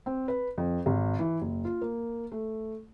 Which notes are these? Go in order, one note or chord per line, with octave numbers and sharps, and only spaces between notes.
C4
B4
F2
G#1
E3
F#1
F4
A#3
A3